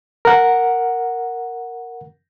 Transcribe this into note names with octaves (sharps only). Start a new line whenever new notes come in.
A#4 F#5